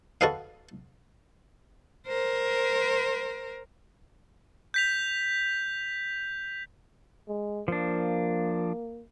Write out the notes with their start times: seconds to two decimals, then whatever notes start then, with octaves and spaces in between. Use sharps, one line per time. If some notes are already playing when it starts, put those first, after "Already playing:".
0.21 F#4 A4 B4 D#5 F5
2.07 A#4 C5
4.74 G6 B6 F7
7.28 G#3
7.68 F3 A#3 D4